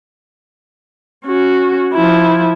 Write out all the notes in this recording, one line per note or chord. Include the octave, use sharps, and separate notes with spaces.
C#4 F#4
F3 E4